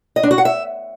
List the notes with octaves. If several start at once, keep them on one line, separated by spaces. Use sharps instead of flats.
D#5
D4
F#4
F#5
E5